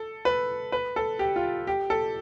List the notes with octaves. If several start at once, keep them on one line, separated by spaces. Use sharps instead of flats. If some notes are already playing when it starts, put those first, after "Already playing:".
Already playing: A4
B4
B4
A4
G4
F4
G4
A4